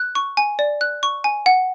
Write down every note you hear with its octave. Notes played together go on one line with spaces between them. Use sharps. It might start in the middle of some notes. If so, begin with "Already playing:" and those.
Already playing: F#6
C#6
G#5
D5
F#6
C#6
G#5
F#5